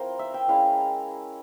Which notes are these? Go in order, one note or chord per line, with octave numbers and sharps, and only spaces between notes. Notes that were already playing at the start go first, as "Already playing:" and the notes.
Already playing: F3 C4 E4 A#4 C5
E5
G5
G#3 C#4 E4 F5